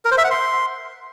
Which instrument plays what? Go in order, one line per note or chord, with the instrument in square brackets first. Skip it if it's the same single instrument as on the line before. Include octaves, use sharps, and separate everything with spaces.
[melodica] A#4
C5
E5
F#5
C6